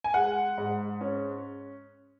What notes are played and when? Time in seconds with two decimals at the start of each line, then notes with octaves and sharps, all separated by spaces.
0.04 G#5
0.14 G#3 F#5
0.58 G#2
1.01 C#4